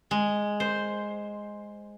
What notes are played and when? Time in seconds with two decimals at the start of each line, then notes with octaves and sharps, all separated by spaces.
0.11 G#3
0.60 C5